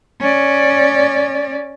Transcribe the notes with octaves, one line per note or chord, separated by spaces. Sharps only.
C#4 D5